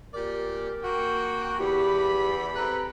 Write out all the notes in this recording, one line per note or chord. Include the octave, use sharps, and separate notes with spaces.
A#2 G4 A#4 D5
A#3 F#4 G5
E2 G4 B5
C3 A4 B4 A#5